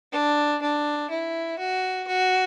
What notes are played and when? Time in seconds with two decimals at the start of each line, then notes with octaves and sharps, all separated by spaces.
0.13 D4
0.62 D4
1.11 E4
1.59 F#4
2.08 F#4